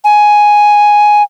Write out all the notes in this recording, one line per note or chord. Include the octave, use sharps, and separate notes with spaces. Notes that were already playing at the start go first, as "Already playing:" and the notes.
G#5